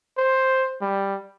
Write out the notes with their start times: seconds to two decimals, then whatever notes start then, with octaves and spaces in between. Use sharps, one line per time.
0.17 C5
0.81 G3